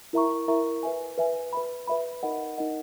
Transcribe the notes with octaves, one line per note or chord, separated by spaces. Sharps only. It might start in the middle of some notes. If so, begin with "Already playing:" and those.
E4 A#4 E5 A#5 C#6
E4 A#4 E5 A#5 C#6
B4 E5 G#5
B4 E5 G#5
B4 E5 B5
B4 E5 B5
D#4 A#4 D#5 F#5
D#4 A#4 D#5 F#5